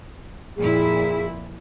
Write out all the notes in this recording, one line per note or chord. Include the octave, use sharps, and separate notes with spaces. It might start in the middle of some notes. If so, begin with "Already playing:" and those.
F2 A#2 E4 G#4